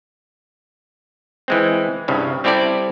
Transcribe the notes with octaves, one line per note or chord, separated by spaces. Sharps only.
E3 G#3 C4
C2 G2 C#3
G3 C4 E4 G4 A4 D5